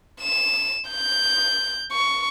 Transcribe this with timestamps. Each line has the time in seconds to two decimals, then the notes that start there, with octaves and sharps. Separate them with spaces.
0.21 E7
0.90 G6
1.93 C#6